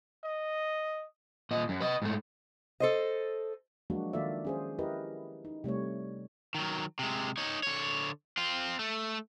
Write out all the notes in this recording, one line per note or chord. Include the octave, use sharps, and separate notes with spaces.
D#5
A#2 D#5
F#2
B4 D#5
G#2 A3
A4 C5 D#5
F3 F#3 G#3 A#3 D4 F#4
D#3 A#3 F4 A4 D5 E5
C#4 G#4 C5
E4 G4 A#4 B4 D#5
D#4
C3 G3 A3 C#5
D#3 F#3
C3 G#3
D#4 C#5
D3 C#5
C4 F4
A3